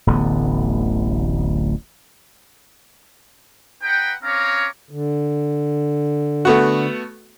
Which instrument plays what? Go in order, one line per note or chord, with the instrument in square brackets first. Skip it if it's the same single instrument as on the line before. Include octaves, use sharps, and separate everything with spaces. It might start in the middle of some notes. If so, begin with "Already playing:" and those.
[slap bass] D1 A1 D3 B3
[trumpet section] D#4 B4 F#5 G5
C4 C#4 C#5 F5 A#5 D6
[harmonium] D3
[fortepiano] A3 B3 F#4